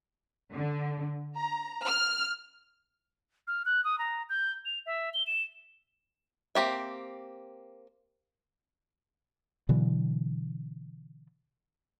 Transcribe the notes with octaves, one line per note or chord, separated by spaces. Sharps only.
D3
A#5
F6
F6
F#6
D#6
A#5
G6
F7
E5
G7
E7
A#3 C4 G4 E5
B2 D3 E3 F#3